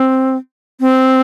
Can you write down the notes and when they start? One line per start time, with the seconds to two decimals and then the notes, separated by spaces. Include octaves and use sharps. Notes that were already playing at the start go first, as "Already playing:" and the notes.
Already playing: C4
0.80 C4